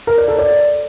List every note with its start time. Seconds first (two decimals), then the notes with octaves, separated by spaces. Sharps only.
0.07 A#4
0.18 D5
0.28 A4
0.39 D5